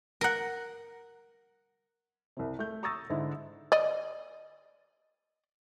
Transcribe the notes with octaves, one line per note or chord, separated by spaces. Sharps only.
A#4 F#5
C2 C3
A3 G6
A#5 C#6 D#6 E6 A6 A#6
G#2 D3 E4
D5 D#5